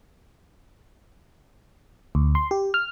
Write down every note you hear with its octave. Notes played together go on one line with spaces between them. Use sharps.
D2
C6
G4
F6